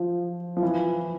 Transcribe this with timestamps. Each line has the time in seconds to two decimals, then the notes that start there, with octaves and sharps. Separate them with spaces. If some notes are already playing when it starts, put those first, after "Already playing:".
Already playing: F3
0.57 F3
0.63 E3